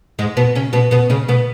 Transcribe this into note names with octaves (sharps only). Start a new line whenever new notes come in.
G#2 G#3
B2 B3
C#3 C#4
B2 B3
B2 B3
C#3 C#4
B2 B3